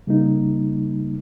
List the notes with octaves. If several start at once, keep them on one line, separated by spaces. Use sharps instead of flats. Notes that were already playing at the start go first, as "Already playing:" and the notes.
C#3 G3 A#3 D#4